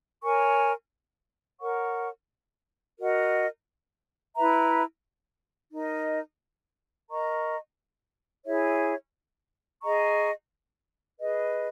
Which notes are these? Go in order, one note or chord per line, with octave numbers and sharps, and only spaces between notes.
A#4 C#5 G#5 C#6
A#4 C#5 F#5 C#6
F#4 A#4 D#5 F#5
E4 B4 E5 A#5
D#4 A#4 D#5
A#4 D#5 A#5 C#6
E4 G#4 C#5 E5
G#4 D#5 A#5 C#6
G#4 B4 D#5